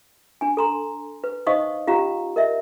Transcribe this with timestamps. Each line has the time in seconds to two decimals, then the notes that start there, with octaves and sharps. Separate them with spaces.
0.41 D4 G#5
0.57 A4 A#5 C6
1.24 B4
1.47 D#4 C5 D#5 F5 C#6 D#6
1.87 C#4 F4 G4 F5 A#5
2.36 A#4 D#5 E5